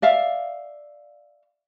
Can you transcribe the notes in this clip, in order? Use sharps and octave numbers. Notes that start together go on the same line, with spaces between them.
D5 E5 F5